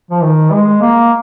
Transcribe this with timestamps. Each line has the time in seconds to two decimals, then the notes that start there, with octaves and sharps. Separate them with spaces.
0.11 F3
0.22 D#3
0.51 G#3
0.81 A#3